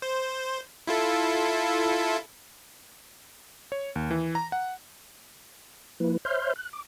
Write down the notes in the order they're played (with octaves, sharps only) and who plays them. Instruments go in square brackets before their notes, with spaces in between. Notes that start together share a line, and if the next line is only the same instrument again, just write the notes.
[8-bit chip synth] C5
E4 F4 A4
[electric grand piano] C#5
D#2
E3
A#5
F#5
[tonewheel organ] F3 A#3 E4 B4
C5 C#5 E5 C6 F6 G6
F#6
D6